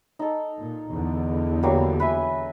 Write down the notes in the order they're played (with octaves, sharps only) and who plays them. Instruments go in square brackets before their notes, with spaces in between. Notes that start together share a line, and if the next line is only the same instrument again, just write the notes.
[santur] D#4 A4
[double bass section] A#2
E2 D3
[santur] F#3 G3 A#3
B4 E5 G#5